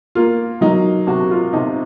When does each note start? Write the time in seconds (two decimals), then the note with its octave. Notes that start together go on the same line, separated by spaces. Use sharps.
0.15 A#3 F4
0.61 F#3 D#4
1.07 C3 F#4
1.31 F4
1.53 C3 D#4